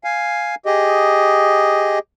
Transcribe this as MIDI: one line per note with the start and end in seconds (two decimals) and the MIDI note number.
0.04 0.55 77
0.04 0.55 80
0.66 1.99 67
0.66 1.99 68
0.66 1.99 75